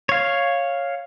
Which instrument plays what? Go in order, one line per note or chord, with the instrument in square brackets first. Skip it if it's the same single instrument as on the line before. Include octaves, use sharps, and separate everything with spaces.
[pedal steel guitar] C#5 F5